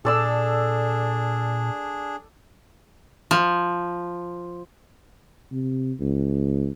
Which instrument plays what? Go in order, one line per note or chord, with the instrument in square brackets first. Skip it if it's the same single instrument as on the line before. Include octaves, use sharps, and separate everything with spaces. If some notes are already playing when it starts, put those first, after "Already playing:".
[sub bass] A#2 [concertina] D4 G#4 [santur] A4 D5 E6
[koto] F3
[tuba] C3
C#2